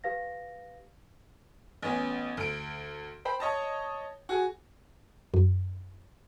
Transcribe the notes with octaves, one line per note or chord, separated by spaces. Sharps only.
G4 B4 F5 A#6
A1 B3 C#4
D2 D7
C5 G5 B5
C#5 D#5 A5
F#4 G#4
F#2